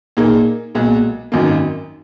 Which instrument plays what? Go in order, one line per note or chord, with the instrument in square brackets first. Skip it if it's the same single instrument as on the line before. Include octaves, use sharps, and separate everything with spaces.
[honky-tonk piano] A#2 A#3 D#4 G#4
B1 A#2 G#3
G#1 F#2 D#3 A#3